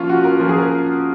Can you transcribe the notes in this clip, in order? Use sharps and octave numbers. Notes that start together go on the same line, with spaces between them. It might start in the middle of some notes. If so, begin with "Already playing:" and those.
Already playing: F3 A#3 C#4 F4
F#4
A#4
F3 A#3 C#4 A#4
G#4
A#4